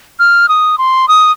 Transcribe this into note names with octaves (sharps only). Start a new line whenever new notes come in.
F6
D#6
C6
D#6